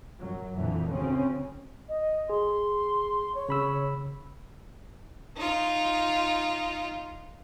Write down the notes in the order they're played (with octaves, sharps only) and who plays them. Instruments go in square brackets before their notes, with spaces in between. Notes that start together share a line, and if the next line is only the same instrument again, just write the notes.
[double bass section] F#2 F#3
F2 A#2 D3 E3
D2 C#3 C4 C#4
[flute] D#5
[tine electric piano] G#4 [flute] C6
[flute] C#5
[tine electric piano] C#3 B5 E6
[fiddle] D#4 F4